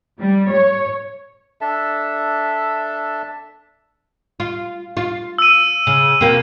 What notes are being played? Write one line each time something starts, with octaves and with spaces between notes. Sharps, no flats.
G3
C#5
D4 A4 E5 A5
F4
F4
E6 D#7
C#3
B2 A#3 C4